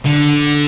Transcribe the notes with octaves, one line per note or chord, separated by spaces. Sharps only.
D3